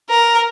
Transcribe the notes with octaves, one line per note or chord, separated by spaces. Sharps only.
A#4